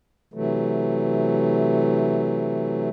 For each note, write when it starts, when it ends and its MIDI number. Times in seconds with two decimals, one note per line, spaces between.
0.34 2.89 48
0.34 2.89 52
0.34 2.89 54
0.34 2.89 57